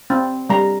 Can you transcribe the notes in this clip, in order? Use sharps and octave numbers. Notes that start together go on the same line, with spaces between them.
C4
G3 A#5